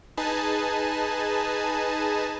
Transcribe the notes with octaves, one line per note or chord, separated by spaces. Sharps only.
D#4 G#4 B4 G#5 A5